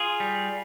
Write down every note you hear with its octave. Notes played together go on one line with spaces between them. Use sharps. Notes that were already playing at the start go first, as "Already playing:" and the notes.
Already playing: F4 G#4
G3